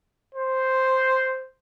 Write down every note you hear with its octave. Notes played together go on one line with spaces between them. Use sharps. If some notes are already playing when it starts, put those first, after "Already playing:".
C5